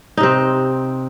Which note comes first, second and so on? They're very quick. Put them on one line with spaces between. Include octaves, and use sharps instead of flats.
D#4 C3 C4